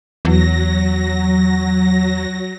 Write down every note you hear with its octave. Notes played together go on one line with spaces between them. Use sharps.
E2 F#3 A#6